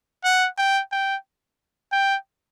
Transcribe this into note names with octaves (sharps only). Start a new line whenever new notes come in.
F#5
G5
G5
G5